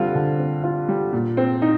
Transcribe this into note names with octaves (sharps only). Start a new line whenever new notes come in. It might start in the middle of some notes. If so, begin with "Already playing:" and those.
Already playing: D3 G3 C4 F4
D3
C4
F4
G3
A#2
C4
D#4